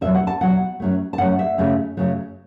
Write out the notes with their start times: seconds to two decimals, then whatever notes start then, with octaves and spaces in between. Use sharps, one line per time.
0.01 E2 B2 F#3 E5
0.15 F#5
0.27 A5
0.41 E2 B2 F#3 F#5
0.80 F#2 F#3 A3
1.13 A5
1.18 F#2 F#3 A3 F#5
1.39 E5
1.58 F#2 C#3 F#3 A3
1.97 F#2 C#3 F#3 A3